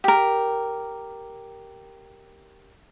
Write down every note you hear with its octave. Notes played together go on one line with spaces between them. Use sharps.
G4 A#4